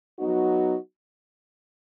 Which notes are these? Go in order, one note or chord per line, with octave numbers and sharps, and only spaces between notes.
F#3 B3 D#4 F#4